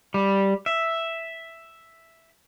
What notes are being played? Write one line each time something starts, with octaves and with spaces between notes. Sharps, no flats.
G3
E5